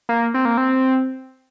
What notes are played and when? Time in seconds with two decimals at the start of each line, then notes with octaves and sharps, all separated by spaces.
0.09 A#3
0.34 C4
0.45 A#3
0.58 C4